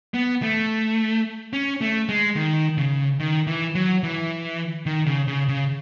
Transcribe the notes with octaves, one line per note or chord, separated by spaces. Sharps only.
B3
A3
C#4
A3
G#3
D#3
C#3
D#3
E3
F#3
E3
D#3
C#3
C#3
C#3